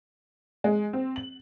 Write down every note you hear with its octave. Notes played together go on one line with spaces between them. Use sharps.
G#3
C4
F#7